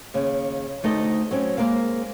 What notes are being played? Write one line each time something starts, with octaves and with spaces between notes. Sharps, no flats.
D#2 C#3
D2 A3 D#4 C5 D#5
F#3 C4 C#4
G#3 A#3 B3 A#4 C5 F5